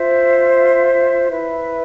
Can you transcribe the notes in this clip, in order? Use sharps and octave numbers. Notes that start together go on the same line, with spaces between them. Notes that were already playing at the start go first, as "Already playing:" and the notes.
Already playing: F4 C5 E5
E4 B4 E5